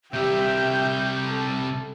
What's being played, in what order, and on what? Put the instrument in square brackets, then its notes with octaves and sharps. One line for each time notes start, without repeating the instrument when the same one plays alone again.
[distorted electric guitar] C3 G3 [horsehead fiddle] G4 E5 [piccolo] G6
[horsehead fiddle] A4